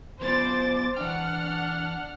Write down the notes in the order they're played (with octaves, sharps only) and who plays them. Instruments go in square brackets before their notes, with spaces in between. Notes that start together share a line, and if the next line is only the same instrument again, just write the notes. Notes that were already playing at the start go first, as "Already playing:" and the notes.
[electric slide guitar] F#3 B3 F4 [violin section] C5 D6 A6
[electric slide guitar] E3 G5 [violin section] D4 F#5 F6